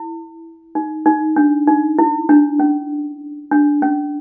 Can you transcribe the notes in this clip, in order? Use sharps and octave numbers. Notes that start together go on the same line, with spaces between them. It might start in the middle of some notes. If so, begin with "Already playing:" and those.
Already playing: E4
D#4
D#4
D4
D#4
E4
D4
C#4
D4
C#4